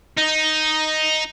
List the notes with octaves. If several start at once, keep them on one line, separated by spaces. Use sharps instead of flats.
D#4